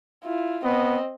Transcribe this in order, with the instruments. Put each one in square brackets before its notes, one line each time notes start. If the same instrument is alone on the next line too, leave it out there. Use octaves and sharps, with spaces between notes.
[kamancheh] E4 F4
[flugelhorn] B3 [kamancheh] C4 D#5